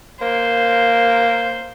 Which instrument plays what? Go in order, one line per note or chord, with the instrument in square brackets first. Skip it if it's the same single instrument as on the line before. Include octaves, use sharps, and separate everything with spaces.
[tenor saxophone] A#3 [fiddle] C5